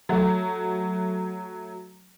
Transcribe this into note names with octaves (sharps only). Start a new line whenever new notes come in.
F#3 A3 F#4